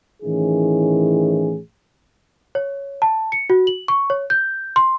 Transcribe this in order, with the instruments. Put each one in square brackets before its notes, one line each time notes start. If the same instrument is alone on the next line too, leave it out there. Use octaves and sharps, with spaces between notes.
[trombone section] A2 D#3 E3 C#4 E4 G#4
[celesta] C#5
A5
C#7
F#4
F#7
C#6
C#5
G6
C6